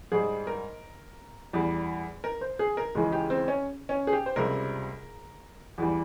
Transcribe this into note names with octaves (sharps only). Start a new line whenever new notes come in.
G#2 G3 G#4
A#4
E2 E3 G3
A#4
C5
G#4
A#4
C#2 C#3 E3 G#3
G4
C4
C#4
C#4
G#4
G4
C5
C#2 C3 G3 A#4
E2 E3 G3